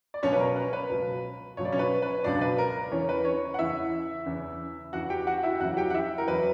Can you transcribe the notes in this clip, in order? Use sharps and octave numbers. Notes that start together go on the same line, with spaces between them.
D5
C#2 B2 F#3 C#4 C#5
B4
A#4
B4
B4
C#2 B2 F#3
C#2 B2 F#3 C#5
D5
C#4 C#5
B4
B4
C#2 B2 F#3 D4 D5
B4
A#4
E2 C#3 E3 C#4 C#5
B4
C#4 C#5
F#5
E2 C#3 E3 E4 E5
E2 C#3 E3
E2 C#3 E3 F#4 F#5
G4 G5
F#4 F#5
E4 E5
E2 C#3 F#3 F#4 F#5
G4 G5
F#5
E4 E5
A#4
E2 C#3 F#3 B4